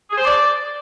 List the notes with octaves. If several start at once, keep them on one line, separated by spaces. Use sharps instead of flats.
G#4
C5
D5